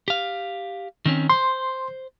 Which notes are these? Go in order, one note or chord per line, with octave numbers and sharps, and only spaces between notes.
G4 F5
D#3 C4 C#4
C5 C6